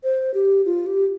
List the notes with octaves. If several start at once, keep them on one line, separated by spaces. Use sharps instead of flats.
C5
G4
F4
G4